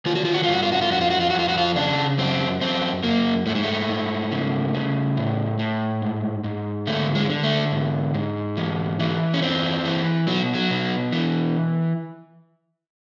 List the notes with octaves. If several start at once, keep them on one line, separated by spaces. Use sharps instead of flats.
D#3 F4
F#4
F4
F#4
F4
G2 F#4
F4
F#4
F4
F2 F#4
F4
F#4
F4
F#4
F2
F4
F#4
F4
C#3 D4
F#2 C4
F#2 C4
F#2 A#3
G#2 A3
G#3
A3
G#2
C#3
C#3
A2
A2
G#2
G#2
D3 A3
G#3
D3
A3
G#2
G#2
E3
E3
C#4
E2 C4
E3
B2 F#3
F#3
B2
E3